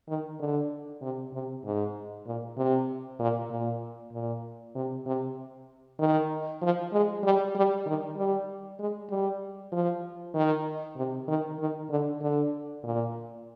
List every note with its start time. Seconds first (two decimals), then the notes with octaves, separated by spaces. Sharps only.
0.09 D#3
0.39 D3
1.02 C3
1.34 C3
1.65 G#2
2.26 A#2
2.57 C3
3.19 A#2
3.50 A#2
4.13 A#2
4.75 C3
5.06 C3
5.99 D#3
6.62 F3
6.93 G#3
7.24 G3
7.55 G3
7.86 D#3
8.17 G3
8.79 G#3
9.10 G3
9.72 F3
10.35 D#3
10.96 C3
11.28 D#3
11.59 D#3
11.90 D3
12.21 D3
12.84 A#2